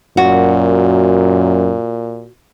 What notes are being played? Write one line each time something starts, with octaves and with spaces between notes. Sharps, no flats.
F#2 A#2 F#4